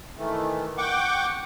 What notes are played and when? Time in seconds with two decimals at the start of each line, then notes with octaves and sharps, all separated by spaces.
0.17 D#3 E3 A3
0.78 F#5 G5 C#6 D6